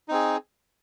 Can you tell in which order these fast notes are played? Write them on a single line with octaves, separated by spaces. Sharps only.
D#4 C4 G#4